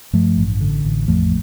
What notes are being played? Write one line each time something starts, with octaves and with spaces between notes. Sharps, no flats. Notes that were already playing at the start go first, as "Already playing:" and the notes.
G2 F3 A3
A1
D3
A1
F2 F3 A3